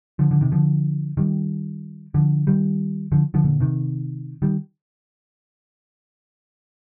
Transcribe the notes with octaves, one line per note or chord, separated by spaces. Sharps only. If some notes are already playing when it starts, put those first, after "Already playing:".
D3 F3
D3 F3
C3 D#3
D3 F3
D#3 G3
D3 F3
D#3 G3
D3 F3
D3 F3
A#2 D3
C3 D#3
D#3 G3